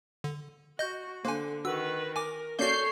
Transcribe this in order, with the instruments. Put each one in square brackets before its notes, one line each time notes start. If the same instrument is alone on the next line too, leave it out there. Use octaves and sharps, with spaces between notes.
[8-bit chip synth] D3
[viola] F#4 [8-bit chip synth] D#5 G6
[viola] D3 [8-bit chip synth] A#3 G#5 [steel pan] C5 F#5
[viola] D#3 B4 [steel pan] F#4 [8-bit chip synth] E6
[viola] A#4 [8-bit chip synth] G#5 D6
[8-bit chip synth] A#3 F#4 [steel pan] C#4 D5 [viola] A4 C#5 [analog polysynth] G6 C7